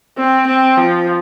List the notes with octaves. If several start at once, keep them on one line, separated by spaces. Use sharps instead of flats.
C4
C4
F3